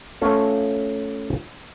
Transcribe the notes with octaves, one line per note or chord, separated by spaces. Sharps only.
A3 C#4 F4 A4